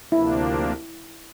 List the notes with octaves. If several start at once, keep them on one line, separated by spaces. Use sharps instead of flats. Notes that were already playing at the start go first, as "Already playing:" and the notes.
D2 C3 F3 A#3 D4 E4